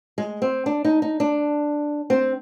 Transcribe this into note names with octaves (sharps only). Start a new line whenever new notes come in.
G#3
C4
D4
D#4
D#4
D4
C4